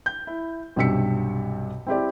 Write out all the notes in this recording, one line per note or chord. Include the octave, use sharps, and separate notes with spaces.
G6
E4
B1 G2 C3 E6 B6 C#7
C4 E4 G4 D5